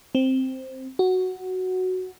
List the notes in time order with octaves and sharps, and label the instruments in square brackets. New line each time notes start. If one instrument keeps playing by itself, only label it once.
[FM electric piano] C4
F#4